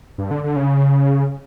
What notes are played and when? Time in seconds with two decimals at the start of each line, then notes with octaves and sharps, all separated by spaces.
0.18 G2
0.31 D3
0.44 D3
0.56 C#3